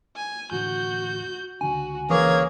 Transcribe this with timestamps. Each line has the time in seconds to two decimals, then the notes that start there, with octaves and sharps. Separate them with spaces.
0.16 G#5
0.51 E2 A2 D3 F#4 G6
1.61 C#2 D3 D4 F#4 G#5
2.10 E3 A#3 C#4 G#4 A#4 G#6